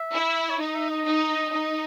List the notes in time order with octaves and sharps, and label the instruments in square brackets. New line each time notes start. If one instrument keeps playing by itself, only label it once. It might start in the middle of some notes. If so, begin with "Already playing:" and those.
Already playing: [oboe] E5
[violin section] E4
[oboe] C#5
[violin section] D#4 [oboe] D#5
[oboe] E5
D#5
[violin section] D#4
D#4